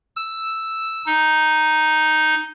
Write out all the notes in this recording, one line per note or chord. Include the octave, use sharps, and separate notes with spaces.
E6
D#4